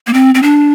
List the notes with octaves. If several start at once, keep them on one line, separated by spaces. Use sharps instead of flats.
A#3
C4
C4
D4